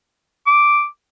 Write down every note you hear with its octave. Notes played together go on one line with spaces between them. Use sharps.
D6